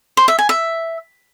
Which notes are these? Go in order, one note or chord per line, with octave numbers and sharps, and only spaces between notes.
C5
E5
G#5
E5